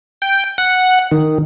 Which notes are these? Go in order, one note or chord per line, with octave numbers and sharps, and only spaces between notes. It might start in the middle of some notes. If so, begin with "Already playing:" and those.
G5
F#5
D#3